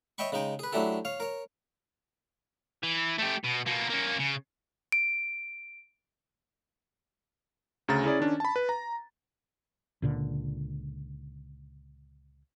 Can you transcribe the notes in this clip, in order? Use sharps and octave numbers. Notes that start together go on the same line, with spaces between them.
C#5 D#5 E5 G5 B5 C#6
C#3 G#3 D#4 G5
G#4 B4
F#3 A3 D4 E4 G4 A4
C#5 F5
A#4 C#5
E3
A3 G4
B2
B2 A#3
A#3 C#4
C#3
D7
D2 C#3 A#5 A6
C#4 E4 G#4 D5
D#3 C#4 D4
A5 B5
B4
A#5
C#2 A#2 D3